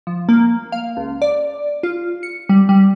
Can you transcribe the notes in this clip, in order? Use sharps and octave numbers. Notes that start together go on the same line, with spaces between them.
F3
A#3
F5
C#2
D5
F4
C#7
G3
G3